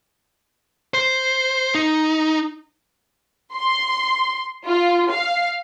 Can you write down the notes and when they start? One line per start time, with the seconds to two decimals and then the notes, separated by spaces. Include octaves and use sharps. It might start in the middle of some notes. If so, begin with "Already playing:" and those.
0.94 C5
1.75 D#4
3.55 C6
4.67 F4
5.12 F5